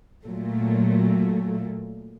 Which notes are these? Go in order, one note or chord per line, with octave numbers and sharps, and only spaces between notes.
A#2 F#3 A3